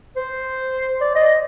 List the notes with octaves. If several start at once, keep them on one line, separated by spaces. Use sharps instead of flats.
C5
D5
D#5